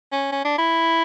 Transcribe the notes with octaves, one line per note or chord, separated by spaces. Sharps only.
C#4
C#4
D4
E4